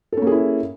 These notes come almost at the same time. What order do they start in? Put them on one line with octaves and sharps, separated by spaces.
A4 C#4 A#3 G#4 E4